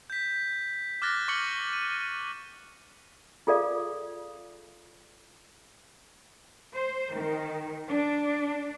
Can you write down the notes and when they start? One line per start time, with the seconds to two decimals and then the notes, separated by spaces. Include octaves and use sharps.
0.10 G6 B6
1.02 D6 F6 F#6 A6 A#6
1.28 C#6 D6 F6 C#7 F#7 G7
1.73 D#7
3.47 F4 G#4 A4 D5 F5
6.73 C5
7.13 D#3
7.87 D4